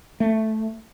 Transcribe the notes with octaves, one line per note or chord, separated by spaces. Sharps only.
A3